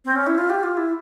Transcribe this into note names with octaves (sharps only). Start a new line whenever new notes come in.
C4
C#4
E4
F4
G4
F4
E4